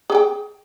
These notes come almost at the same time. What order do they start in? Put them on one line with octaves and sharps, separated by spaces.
G#4 G#5 G5